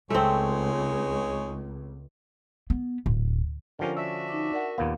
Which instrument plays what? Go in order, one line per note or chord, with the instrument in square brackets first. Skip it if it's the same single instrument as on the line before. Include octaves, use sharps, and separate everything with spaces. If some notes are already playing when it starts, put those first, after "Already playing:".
[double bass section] C#2 [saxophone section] G#3 D#4 C#5 [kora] A3 C4
[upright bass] B3
D1
[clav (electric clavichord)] D3 F3 C#4 [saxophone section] G4 A#4
[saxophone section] D4 F#4 E5 [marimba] E6
[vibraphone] D#4 D6
[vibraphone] A#4 [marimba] D5 F#5
[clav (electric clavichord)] D#2 A#2 B3 [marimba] F5